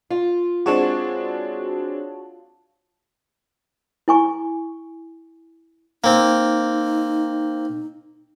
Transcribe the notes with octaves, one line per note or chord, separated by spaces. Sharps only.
F4
G#3 C4 D4 F#4 C#5 A5
E4 G#5 C#6
A#3 C4 D#4